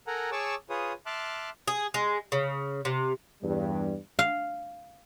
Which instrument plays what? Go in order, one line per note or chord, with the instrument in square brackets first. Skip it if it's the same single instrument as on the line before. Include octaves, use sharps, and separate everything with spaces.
[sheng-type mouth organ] A4 A#4 F#5 G#5 A#5
G#4 C#5 A5 C#6 D6 E6
F4 G#4 B4 C#5 D#6
E5 A5 C6 D6 F6 F#6
[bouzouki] G#4
G#3
C#3
C3
[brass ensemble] E2 G2 G3
[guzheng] F5